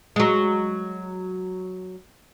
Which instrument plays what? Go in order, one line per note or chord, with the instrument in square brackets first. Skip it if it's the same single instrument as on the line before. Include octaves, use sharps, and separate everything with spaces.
[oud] F#3 G#3